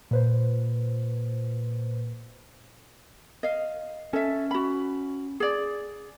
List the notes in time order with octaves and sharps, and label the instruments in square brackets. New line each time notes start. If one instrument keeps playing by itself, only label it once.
[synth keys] A#2 B4 C5
[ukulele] D#5 F5
[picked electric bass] C#4 [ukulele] A4 E5
[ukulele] F#4 B5
G#4 D5